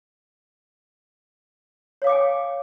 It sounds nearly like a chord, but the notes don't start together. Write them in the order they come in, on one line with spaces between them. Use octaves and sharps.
C#5 F5 D6 G5 G#5